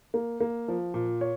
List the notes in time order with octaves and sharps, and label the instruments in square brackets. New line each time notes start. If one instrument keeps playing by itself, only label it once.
[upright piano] A#3
A#3
F3
A#2
C#5